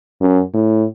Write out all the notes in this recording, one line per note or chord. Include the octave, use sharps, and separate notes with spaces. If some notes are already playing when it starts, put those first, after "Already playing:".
F#2
A2